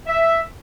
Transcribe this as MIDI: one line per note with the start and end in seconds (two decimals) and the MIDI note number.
0.07 0.39 76